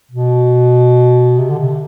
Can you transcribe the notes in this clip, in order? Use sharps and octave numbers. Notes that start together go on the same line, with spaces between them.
B2
C3
D3
C3